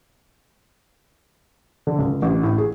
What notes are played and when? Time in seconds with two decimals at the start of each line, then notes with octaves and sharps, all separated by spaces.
1.87 D3
1.99 C#2
2.22 A1
2.43 A2
2.58 G#4